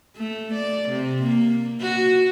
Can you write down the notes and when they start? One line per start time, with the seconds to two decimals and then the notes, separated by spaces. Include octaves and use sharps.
0.16 A3
0.54 D5
0.89 C3
1.23 A#3
1.81 F#4